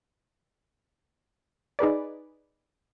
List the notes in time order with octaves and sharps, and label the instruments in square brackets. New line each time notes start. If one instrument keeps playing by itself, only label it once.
[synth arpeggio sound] D#4 G#4 B4 D5